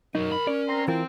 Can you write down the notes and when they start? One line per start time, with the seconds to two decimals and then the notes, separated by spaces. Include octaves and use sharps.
0.15 B1 F#2 F#3 D#4 A#4
0.30 B1 B5
0.47 C#4 D5
0.68 C4 A#5 C6
0.88 E3 C4 E4 F4 A#4